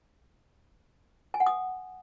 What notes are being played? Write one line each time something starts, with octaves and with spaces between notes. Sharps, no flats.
G#5
F#5
D#6